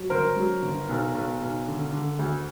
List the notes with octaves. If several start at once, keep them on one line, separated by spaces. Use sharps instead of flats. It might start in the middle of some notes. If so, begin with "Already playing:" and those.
Already playing: F#3
G1 A#4 C5
F#3
G1
B1
B1
B1
D3
D3
D2